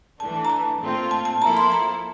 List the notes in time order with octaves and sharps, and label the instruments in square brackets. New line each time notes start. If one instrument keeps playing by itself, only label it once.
[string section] E3 A3 D4 [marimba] A5
[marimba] A#5
A5
[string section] A#2 A3 C4 F4
[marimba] A5
A5
[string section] F3 A#3 E4 A4 [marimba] A#5
[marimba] C6
A#5